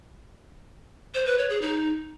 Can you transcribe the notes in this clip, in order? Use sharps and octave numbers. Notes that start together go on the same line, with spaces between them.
C5
B4
C#5
G#4
D#4